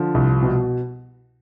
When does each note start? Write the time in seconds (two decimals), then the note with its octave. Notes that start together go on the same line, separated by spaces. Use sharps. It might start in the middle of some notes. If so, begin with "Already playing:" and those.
Already playing: D3 F3
0.14 C2
0.42 B2